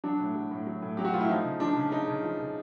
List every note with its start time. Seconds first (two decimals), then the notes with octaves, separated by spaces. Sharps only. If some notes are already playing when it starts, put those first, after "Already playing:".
0.04 F#3 D4
0.20 A2
0.35 F#3
0.51 A2
0.67 F#3
0.82 A2
0.97 F#3 G4
1.05 F#4
1.14 A2 F4
1.21 E4
1.29 F3 D#4
1.44 C#3
1.60 F3 D4
1.77 C#3
1.92 C#3 D#4
2.08 C#3
2.23 F3
2.40 C#3